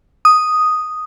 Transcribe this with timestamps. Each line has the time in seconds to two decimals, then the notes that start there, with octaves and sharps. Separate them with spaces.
0.25 D#6